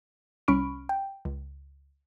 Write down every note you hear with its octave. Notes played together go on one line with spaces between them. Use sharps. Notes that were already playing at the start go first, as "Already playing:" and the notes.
C2 C#4 B5 C#6 F6 D7
G5
C#2